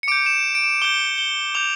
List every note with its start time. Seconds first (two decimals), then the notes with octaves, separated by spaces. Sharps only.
0.03 C#7
0.08 D6 G6 D7
0.26 E7
0.55 D7
0.63 E7
0.82 D6 G6 G7
1.18 G7
1.55 D6 G6 F7